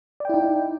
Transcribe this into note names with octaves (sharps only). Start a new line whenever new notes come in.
D#4 E4 D5 G5